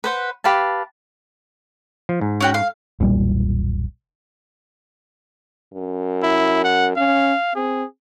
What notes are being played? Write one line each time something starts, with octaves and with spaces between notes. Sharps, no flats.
B4 C5 F#5
G4 B4 F5 A5
F3
G#2
C#4 F#4 G5
F5
E1 B1 A#2 G3
F#2
E4
F#5
C#4 F5
C4 G#4